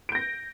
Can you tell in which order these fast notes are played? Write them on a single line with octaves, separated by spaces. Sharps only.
D7 G6 A#6